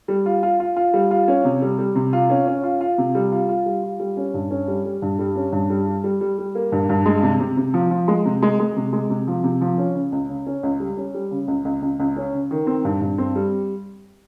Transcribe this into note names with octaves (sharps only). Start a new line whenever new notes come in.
G3
F4
F4
F4
F4
G3
F4
C#4
C3
G3
G3
C3
F4
C#4
C#4
F4
F4
C3
G3
F4
F4
G3
F4
G3
C#4
G2
C#4
G3
G3
G2
G3
C#4
G2
G3
G3
G3
G3
G3
A#3
G2
G2
G#3
C3
C3
C3
F3
F3
G#3
C3
G#3
G#3
C3
G#3
C3
F3
C3
F3
C#4
C#3
C#2
C#3
C#4
C#2
G3
C#4
G3
C#3
C#2
C#2
C#2
C#2
C#4
C#3
D#3
C4
G2
G2
C4
G3